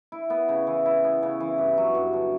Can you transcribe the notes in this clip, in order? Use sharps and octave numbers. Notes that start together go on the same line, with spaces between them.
E4
B3
C#3
E3
E4
B3
C#3
E3
G2
F#3
G2
D3